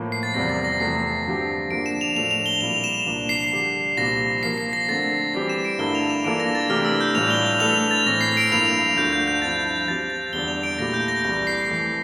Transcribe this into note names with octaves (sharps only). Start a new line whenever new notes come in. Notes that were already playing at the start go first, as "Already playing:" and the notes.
Already playing: A2 F3 A#3
C7
A6
E2 C3 G3 C4 A#6
A6
A#6
E2 C3 F3 A3 C7
G2 D3 F3 C4 G4
D3 F3 A#3 D4 D7
E7
F7
A2 F3 A3 D4 F7
F7
G7
A#2 G3 C4 E4 A#4 F7
E7
C2 A#2 F3 A#3 D4
C7
D3 G3 D4 G4
C2 A#2 F3 C4 G4 A#6
F3 A#3 F4 A#4 C7
C7
A#6
D3 A3 C4 A6
E3 G3 C4 G4 D5 A#6
E7
D7
G2 D3 A3 E4 A#4 G7
F7
E7
E3 A#3 D4 F4 A4 D7
A#6
A6
C3 E3 A3 D4 G4 F6
E6
G6
A2 E3 G3 D4 F4 F7
G7
F7
E3 A3 D4 A4 F7
A6
A2 E3 A3 C4 A#6
C7
D7
G2 F3 A#3 E4 F7
D2 D3 A3 D4 F4 G6
G6
G6
G2 F3 C4 E4 A6
F3 C4 G4 A6
A6
E2 D3 G3 G7
F7
D7
A#2 A3 E4 G4 A#6
G6
A#6
C2 C3 E3 G3 A#6
C7
F2 E3 A3